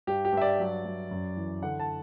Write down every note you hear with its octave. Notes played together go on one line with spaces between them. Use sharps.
G2 G4
G4
G2 E5
D5
F#3
F#3
F#2
E3
D3 F#5
A5